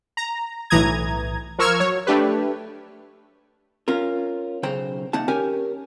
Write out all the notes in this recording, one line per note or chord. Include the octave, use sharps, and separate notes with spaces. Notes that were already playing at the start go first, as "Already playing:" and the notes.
A#5
B1 A2 E3 A#5 D#6 G#6
F3 A#4 C#6 E6 F6 G#6
F#3 C#5
A3 D4 G4 B4
C#4 F4 A#4
B1 C#3 C5 G5 A#5
C3 A#3 D#4 F#5 A5
C#4 G4 A#4 C#5 G#5